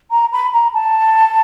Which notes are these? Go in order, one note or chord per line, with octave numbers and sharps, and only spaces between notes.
A#5
B5
A#5
A5